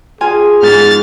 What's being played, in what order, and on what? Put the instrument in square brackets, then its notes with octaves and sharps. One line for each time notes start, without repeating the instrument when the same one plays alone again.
[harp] F4 G#5 [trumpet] G#4
[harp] G#2 [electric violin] F6 A6